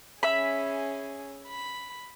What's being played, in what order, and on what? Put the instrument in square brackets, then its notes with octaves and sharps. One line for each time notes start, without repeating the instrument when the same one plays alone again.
[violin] C#4 G#4 [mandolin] E5 B5
[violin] B5